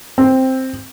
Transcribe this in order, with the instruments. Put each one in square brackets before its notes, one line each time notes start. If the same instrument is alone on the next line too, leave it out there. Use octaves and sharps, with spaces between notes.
[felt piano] C4